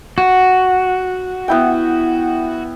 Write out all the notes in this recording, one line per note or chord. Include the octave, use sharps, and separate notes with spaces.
F#4
B3 E4 G5